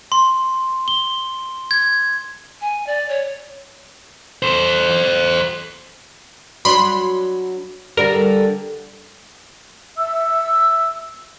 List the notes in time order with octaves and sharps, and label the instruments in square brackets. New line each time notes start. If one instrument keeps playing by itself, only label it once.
[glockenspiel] C6
G7
G#6
[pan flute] G#5
D5
C#5
[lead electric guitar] A4 C5
[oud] F#3 D4 [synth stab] B5 C6
[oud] D3 G3 [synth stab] A#4
[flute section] E5 E6